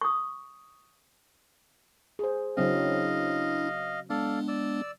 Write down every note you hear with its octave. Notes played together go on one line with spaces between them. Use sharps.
C#6 D#6
G#4 C5
C#3 F#3 C4 D4 E4 D#5 F5
G#3 B3 D4 A4 D5 F5
D5 E6